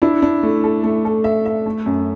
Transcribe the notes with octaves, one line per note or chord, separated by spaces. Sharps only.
D4 E4
D4
A3
A4
A3
A4
E5
E5
A3
F#2